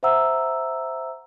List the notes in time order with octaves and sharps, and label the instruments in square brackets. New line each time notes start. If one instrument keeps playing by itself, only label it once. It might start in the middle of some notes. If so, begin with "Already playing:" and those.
[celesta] C5 E5 F#5 A#5 E6